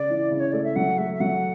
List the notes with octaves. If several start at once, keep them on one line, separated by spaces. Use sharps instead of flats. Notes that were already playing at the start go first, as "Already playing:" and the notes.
Already playing: C#3 D5
E3
C#3
C#5
A3 D5
E5
F#3 F#5
A3 E5
E5
F#3 F#5